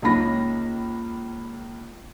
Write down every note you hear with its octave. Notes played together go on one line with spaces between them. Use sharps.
C#2 A#3 C#4 D#4 B5 A#6